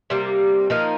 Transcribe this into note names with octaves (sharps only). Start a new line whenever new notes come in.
C3 G3 A#3
F3 A#3 D#4 A#4